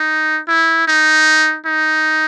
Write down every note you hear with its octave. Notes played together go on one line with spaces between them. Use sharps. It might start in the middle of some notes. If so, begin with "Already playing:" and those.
Already playing: D#4
E4
D#4
D#4